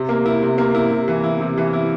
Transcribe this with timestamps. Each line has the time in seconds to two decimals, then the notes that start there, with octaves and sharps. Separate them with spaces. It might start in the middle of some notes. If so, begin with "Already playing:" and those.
Already playing: C3
0.09 A#3
0.26 E4
0.43 C3
0.58 A#3
0.75 E4
0.91 C3
1.08 E3
1.24 E4
1.41 C3
1.58 E3
1.73 E4